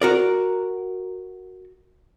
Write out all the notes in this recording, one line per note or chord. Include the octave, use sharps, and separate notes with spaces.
F#4 A#4 D5